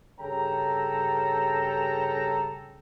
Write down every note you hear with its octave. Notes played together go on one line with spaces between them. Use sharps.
G2 C#3 C#4 A4 G5 A#5